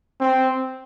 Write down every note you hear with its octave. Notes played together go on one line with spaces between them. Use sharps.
C4